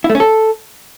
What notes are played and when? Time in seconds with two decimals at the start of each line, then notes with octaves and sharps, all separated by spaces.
0.04 E4
0.10 A3
0.15 C#4
0.20 A4